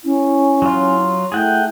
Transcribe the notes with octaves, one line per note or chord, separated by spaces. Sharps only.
C#4 E4
F#3 F4
A3 E4 G#4 F#5 G5